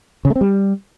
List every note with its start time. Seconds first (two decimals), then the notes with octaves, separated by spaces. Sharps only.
0.25 C#3
0.30 A3
0.36 C4
0.41 G3